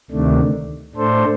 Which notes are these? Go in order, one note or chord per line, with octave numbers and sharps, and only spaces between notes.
D2 C3 D#3 A3 D4
A2 A3 D4 A4 C5